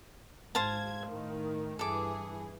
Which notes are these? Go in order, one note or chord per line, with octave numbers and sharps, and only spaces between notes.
G#2 C5 F5 A5 G#6
A2 D#3
G2 E3 G#4 A4 D6